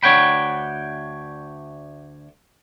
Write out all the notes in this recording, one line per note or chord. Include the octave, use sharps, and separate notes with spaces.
D2 D4 C#5 F#5 G5 B5